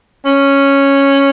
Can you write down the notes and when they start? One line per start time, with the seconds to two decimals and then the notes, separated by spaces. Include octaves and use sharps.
0.25 C#4